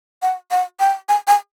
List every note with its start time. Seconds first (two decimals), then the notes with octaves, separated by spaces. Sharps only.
0.22 F#5
0.51 F#5
0.80 G5
1.09 G#5
1.27 G#5